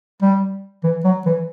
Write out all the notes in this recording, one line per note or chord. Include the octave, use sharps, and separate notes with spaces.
G3
E3
F#3
E3